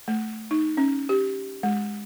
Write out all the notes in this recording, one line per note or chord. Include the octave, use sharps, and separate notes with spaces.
A3
D#4
C#4
G4
G#3